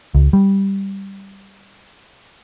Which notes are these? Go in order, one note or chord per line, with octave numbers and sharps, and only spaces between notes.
C#2
G3